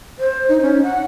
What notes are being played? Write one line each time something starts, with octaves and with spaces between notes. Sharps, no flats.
C5
D#4
C#4
F#5